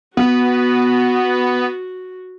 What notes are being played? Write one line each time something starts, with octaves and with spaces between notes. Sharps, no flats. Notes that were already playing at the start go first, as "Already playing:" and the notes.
B3 F#4